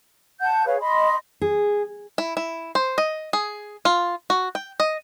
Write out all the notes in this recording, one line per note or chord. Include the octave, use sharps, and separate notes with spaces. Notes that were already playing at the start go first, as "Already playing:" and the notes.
F#5 A5 G6
G#4 B4 C#5 F5
D#5 B5 C6
G#4
E4
E4
C5
D#5
G#4
F4
F#4
G5
D#5